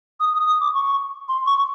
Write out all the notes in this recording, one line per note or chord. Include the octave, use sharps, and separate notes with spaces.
D#6
D#6
D#6
D6
C#6
C6
C#6